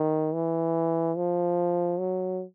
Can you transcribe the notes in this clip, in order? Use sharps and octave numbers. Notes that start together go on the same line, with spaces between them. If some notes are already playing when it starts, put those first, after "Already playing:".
Already playing: D#3
E3
F3
F#3